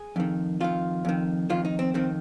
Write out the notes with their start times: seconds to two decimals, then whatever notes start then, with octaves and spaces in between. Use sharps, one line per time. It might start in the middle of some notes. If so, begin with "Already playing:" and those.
Already playing: G#4
0.16 F2 D#3
0.60 F2 D#3 F4
1.05 F2 D#3
1.50 F2 D#3 F4
1.65 D#4
1.79 C4
1.94 F2 D#3 C4